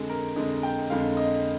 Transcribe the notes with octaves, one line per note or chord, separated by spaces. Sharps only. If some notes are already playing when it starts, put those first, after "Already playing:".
Already playing: F2 D3 G#3 G#4
A#4
F2 D3 G#3 D#5
G5
F2 D3 G#3 F5
D#5